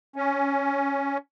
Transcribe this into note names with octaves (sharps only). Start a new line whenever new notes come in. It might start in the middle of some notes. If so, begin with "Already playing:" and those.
C#4